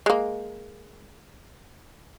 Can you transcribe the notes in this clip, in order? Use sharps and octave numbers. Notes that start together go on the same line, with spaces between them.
G#3 A#3